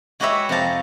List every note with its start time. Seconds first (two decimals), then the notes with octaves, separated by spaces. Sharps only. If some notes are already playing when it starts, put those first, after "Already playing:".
0.20 G#3 F#4 G4 B4 C#5 E5
0.49 F2 C3 C5 F5 A5 A#5